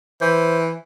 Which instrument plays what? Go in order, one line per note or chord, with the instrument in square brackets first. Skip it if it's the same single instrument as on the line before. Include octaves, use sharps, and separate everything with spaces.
[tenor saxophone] E3 [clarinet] C5